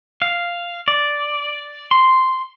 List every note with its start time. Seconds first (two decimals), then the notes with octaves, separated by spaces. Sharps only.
0.22 F5
0.88 D5
1.91 C6